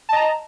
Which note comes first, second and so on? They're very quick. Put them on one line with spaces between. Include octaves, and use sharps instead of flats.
A5 D#5 A#5